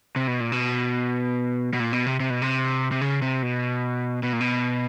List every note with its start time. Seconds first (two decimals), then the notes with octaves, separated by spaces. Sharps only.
0.16 C3
0.27 B2
0.40 A#2
0.52 B2
1.73 B2
1.80 A#2
1.93 B2
2.06 C3
2.20 C3
2.30 B2
2.42 C3
2.92 C3
3.01 C#3
3.22 C3
3.43 B2
4.23 B2
4.33 A#2
4.40 B2